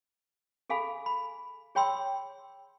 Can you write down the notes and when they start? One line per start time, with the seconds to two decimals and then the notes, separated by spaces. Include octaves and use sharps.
0.70 G#4 A4 F5 G#5 B5
1.06 B5
1.75 G#4 C#5 G5 B5 C6 E6